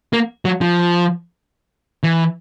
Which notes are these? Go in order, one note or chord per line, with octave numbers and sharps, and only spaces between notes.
A#3
F#3
F3
E3